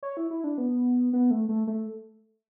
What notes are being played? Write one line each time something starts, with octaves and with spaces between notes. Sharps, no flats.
C#5
E4
E4
D4
B3
B3
A3
A3
A3